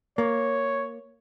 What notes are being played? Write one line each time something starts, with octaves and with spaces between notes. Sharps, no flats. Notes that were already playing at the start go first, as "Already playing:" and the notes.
A#3 C#5